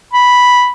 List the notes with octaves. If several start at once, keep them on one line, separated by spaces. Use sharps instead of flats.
B5